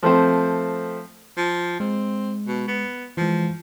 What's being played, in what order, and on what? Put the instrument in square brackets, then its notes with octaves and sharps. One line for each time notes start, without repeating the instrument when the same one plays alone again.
[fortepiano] F3 A3 C4 C5
[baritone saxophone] F3
[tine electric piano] G#3 [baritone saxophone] C4
[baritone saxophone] B2
B3
[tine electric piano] E3 G#3 [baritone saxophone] F3